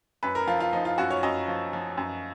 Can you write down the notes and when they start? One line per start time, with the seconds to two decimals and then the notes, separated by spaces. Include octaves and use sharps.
0.23 F#2 B4
0.35 A#4
0.47 F3 F4
0.60 F4
0.73 F3 D#4
0.85 F4
0.98 F#2 F#4
1.11 C#5
1.23 F#2 D#5
1.48 F3
1.73 F3
1.97 F#2